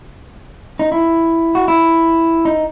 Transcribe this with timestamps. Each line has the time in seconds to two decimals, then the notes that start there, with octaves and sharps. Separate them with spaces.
0.79 D#4
0.92 E4
1.55 F#4
1.68 E4
2.45 D#4